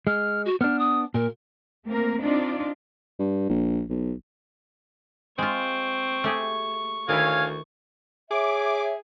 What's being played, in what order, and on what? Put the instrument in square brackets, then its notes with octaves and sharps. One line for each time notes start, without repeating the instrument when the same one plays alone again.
[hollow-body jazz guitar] G#3 [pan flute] F6
[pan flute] F#4
[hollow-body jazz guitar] B3 D4 [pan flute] F6
[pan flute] D#6
[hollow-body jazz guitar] A#2 [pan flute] A#4
[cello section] A3 A#3 C4 A#4
C4 D4 D#4 F4 D5
[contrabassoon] G2
A#1
B1
[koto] G#3 F4 [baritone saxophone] C4 [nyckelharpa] C#6
[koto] A3 G4 G#4
[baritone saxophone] D2 [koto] D#3 E4 [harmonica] C#5 F5 G#5
[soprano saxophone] G#4 [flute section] C#5 E5 [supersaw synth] D6